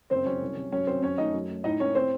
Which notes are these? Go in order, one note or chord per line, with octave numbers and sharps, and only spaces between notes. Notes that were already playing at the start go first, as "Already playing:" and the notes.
F#1 C4 C5
F#2 C#4 C#5
C2
C3
F#2 C#4 C#5
F#2 C4 C5
F#2 C#4 C#5
A3 D#4 D#5
F#2
A3
A2 D#4 D#5
A2 C#4 C#5
C4 C5